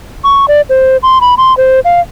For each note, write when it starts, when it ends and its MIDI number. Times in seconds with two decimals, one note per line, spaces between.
0.24 0.46 85
0.48 0.61 74
0.69 0.97 72
1.03 1.18 84
1.21 1.34 83
1.38 1.56 84
1.57 1.80 72
1.85 2.00 77